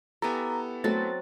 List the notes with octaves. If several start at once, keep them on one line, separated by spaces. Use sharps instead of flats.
B3 E4 G4 A4 G#5 A#5
F#3 A3 C4 F#4 A6